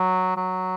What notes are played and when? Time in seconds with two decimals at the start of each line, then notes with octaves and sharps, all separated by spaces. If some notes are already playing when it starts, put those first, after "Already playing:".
Already playing: F#3
0.36 F#3